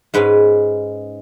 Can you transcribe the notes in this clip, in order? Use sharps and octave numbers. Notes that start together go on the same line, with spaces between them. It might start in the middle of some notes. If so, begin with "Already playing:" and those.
G#2 G#3 C#4 B4